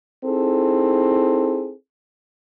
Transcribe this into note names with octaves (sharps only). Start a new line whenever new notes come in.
C4 D#4 E4 G#4 A4